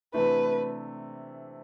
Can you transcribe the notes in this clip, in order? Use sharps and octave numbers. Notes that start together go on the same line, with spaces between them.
C3 E3 A3 D4 B4